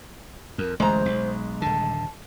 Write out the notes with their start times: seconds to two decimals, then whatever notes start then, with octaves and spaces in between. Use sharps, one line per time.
0.58 F2 A#4
0.80 D1 A1 G#3 C5 A#5
1.06 B1
1.62 D#1 D3 A5